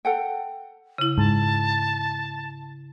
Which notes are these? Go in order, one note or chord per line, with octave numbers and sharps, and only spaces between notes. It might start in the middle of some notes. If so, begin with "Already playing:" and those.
A4 F#5 G5
C#3 E4
G#2 A5